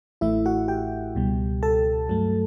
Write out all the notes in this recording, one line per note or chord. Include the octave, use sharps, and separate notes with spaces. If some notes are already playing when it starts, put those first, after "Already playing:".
A1 A2 E3 A3 E4 E5
F#4 F#5
G4 G5
C#2 B2 G3
A4 A5
G2 F#3 A3